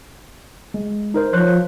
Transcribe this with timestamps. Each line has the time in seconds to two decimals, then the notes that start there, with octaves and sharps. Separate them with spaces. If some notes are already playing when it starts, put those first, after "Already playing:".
0.74 G#3
1.14 D#4 A#4 C5
1.33 F3 C5 C#5 F#6